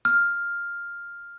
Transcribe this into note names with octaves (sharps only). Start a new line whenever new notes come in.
F6